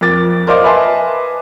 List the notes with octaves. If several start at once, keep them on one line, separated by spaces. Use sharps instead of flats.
F2 A#4 D6 A6
A#4 C5 D5 D#5 F5 D6
B4 D#5 E5 G#5 A5 C6